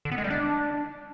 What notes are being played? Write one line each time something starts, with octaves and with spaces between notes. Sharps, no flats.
D3
B3
G#3
G3
D4